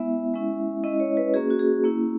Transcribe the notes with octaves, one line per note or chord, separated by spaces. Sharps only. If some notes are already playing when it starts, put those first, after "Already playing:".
Already playing: G#3 B3 E4 E5
G#3 C#4 E4
G#3 C#4 E4 D#5
C#5
B4
A#3 C#4 F#4 G#4
F#4
G#4
A#3 C#4 E4